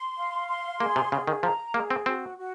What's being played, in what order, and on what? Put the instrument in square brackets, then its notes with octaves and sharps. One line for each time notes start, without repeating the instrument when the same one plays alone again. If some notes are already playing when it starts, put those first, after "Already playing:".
Already playing: [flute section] C6
F5
C6
[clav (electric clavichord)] A#3 [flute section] G#4
[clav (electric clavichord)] C3
[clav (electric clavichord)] C#3 [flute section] G#4
[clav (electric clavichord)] D#3
[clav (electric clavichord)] F3 [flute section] A#5
[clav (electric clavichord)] A#3 [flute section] G#4
[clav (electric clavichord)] C4
[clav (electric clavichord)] C4 [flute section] F#4
[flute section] F#4